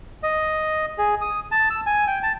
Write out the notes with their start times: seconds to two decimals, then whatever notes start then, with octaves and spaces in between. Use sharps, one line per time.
0.23 D#5
0.98 G#4
1.21 D#6
1.52 A5
1.70 E6
1.86 G#5
2.07 G5
2.23 A5